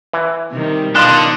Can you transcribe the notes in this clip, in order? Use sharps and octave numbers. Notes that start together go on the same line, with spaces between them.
E3
C3 D#3 G3
B2 D3 D#3 F3 G3 D#5 C6 F#6